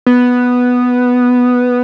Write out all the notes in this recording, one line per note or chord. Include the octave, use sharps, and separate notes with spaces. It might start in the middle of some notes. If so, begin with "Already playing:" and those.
B3